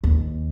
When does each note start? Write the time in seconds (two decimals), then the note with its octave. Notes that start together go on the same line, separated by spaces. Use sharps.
0.04 D#2